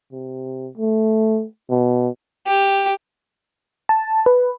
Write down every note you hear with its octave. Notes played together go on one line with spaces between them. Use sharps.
C3
A3
B2
G4
A5
B4